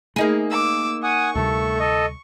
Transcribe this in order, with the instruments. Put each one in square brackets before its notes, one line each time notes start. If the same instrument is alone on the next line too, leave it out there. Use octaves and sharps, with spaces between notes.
[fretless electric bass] A3 [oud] A#3 D#4 G#4
[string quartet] D6 E6
[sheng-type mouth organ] F#5 G#5 D#6 [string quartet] C#6
[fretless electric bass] D2 C3 G3 [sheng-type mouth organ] A3 A4
[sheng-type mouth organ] A4 D#5